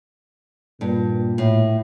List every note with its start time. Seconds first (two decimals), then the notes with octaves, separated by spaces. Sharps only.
0.81 G2 A#2
1.38 A2